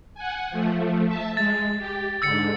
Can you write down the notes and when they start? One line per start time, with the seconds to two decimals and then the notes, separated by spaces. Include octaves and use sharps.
0.15 F#5 G#5
0.50 F3 A3
1.07 E5 A5
1.37 G#3 A6
1.78 G4
2.22 G#2 D3 E6 A6 C#7